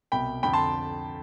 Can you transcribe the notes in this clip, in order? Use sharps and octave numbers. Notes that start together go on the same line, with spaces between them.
C2 B2 G5 B5
F2 D3 G5 B5
A5 C6